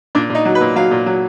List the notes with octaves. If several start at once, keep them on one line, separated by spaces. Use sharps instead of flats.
A#2 D4
A#2
D#4
F#3
B4
A#2
F#3 F5
A#2
F#3